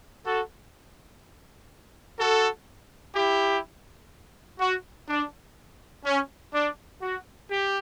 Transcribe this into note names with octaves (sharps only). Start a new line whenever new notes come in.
F#4 A4
F#4 A4
E4 G4
F#4
D4
C#4
D4
F#4
G4